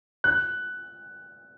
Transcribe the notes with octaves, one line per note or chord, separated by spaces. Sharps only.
F#6